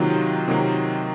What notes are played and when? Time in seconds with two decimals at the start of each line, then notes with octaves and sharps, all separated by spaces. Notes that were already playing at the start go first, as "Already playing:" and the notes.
Already playing: C3 D#3 F#3 A#3 F4
0.48 C3 D#3 F#3 A#3